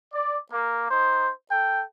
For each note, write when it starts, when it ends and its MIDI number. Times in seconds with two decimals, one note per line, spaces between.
0.12 0.35 74
0.50 0.85 58
0.90 1.29 63
0.90 1.29 72
1.50 1.82 69
1.50 1.82 79